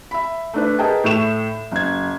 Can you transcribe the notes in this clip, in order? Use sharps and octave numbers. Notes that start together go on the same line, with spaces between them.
E5 B5
A3 D4 B4
G#4 A#4 B4 D#5 G5 A5
A2 A3 C#6 E7
F#1 G#6